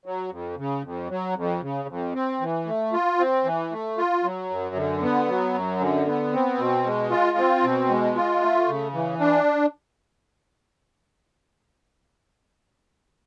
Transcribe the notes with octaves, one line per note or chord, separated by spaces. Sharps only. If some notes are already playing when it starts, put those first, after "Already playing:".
F#3
F2
C#3
F2
F#3
F2
C#3
F2
C4
E3
A3
F4
C4
E3
A3
F4
F#3
F#2
D3
B3
F#3
F#2
D3
B3
C4
B2
G#3
F4
C4
B2
G#3
F4
A3
C#3
E3
D4